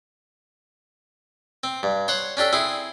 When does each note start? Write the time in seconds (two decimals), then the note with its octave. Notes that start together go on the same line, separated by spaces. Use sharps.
1.64 C4
1.83 G2
2.08 C5 C#5 F#5
2.37 C#4 D4 G4 A4
2.53 C4 E4 G#4